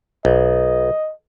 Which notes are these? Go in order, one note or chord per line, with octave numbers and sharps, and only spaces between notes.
B1 D#5